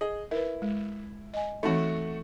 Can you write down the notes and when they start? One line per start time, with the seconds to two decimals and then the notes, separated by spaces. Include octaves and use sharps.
0.01 G#4 D#5
0.31 E4 A#4 B4
0.62 G#3
1.34 D#5 G#5
1.63 E3 A3 C4 D#4 F#4